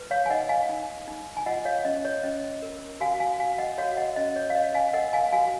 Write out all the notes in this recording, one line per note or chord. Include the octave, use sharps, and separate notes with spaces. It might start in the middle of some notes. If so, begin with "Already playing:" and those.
Already playing: B4
C#5 F5
G#5
D#4 D#5 F#5
F5 G#5
D#4
D#4
G#5
F4 D#5 F#5
C#5 F5
C#4 D#5
C#5
C#4 D#5
A#4
F#4 F5 G#5
F5 G#5
F#4 F5 G#5
D#5 F#5
F#4 C#5 F5
D#5 F#5
C#4 D#5
C#5
F5
C#5 D#5
F5 G#5
A#4 D#5 F#5
F5 G#5
F#4 F5 G#5